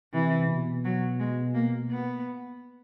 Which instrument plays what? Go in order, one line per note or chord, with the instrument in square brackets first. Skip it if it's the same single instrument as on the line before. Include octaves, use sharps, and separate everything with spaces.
[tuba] C3 [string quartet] E3
[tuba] B2
[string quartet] F#3
G#3
A#3
B3